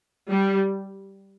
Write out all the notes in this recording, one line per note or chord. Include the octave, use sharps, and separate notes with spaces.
G3